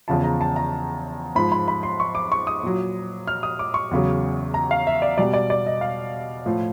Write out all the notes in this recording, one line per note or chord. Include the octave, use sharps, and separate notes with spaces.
E2 C#3 F3 A5
A#5
A5
A#5
G#2 F3 B5
B5
B5
C6
C#6
D6
C#6
D#6
A#2 F#3
F6
D#6
D6
C#6
E2 C#3 F#3
A#5
F5
E5
D5
B2 G3 D5
D5
D5
D#5
F5
A2 F3